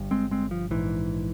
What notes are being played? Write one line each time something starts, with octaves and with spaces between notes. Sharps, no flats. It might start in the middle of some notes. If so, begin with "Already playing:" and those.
Already playing: G1 G2
G#3 C4
G#3 C4
F3
A#1 G#2 E3